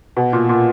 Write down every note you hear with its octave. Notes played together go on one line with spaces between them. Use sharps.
B2
A#2
A#2